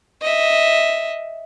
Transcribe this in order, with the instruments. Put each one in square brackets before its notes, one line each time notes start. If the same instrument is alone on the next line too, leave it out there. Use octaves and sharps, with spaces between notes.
[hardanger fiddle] D#5 E5